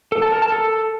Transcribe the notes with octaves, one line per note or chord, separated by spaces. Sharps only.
A4
A5
A#4
A5
A4